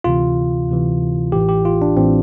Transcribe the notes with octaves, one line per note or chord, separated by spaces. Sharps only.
D2 C3 E3 F4
D2 C3 E3
A1 A2 E3 G4
G4
F4
D4
A1 A2 E3 C4